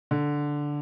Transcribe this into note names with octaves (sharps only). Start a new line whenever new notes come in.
D3